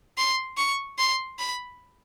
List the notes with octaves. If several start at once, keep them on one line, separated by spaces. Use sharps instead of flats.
C6
C#6
C6
B5